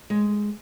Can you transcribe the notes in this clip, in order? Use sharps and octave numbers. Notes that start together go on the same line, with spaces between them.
G#3